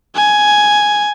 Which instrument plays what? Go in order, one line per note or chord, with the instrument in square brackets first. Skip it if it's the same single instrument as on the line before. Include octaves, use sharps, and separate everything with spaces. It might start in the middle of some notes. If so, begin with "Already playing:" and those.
[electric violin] G#5